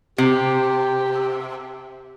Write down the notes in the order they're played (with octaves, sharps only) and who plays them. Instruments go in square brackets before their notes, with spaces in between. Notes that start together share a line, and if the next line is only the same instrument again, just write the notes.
[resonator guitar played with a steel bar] C3 [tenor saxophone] G4